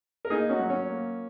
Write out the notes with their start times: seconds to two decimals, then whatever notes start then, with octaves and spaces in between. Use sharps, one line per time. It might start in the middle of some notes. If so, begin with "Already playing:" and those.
0.25 A#4
0.30 A#3 D#4 G#4
0.50 C#4 F#4
0.59 F#3
0.70 C#4
0.90 A#3